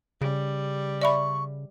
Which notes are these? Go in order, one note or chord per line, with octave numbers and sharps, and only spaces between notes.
C#3 G3
D5 E5 B5 C#6